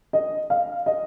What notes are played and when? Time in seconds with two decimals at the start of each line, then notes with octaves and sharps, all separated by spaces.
0.13 D#5
0.50 F5
0.86 D#5